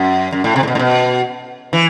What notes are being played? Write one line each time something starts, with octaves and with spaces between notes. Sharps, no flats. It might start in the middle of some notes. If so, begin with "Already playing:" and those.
Already playing: F#2
F#2
A2
C3
A2
B2
A2
B2
E3